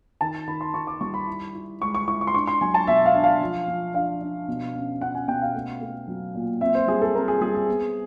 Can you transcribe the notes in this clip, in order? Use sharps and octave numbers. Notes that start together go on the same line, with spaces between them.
D#3 A5
D#3 B5
C6
D#3 C#6
D6
G3 C#6
B5
E4
E4
G#3 C#6
C#6
E4 C#6
C#6
C6
D4 C#6
C6
F#3 G#5
A5
B2 E5
F5
D4
F5
F3
F3
D4 F5
D4
B2
C#4
C#4 F#5
G#5
B2 G5
F5
A3
A3
F#3
A#2
C4 E5
C5
G3 G#4
A4
C4 A#4
G#4
G3 G#4
G#4
B3